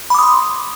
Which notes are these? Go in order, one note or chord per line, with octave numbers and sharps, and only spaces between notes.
B5 C6 D6 D#6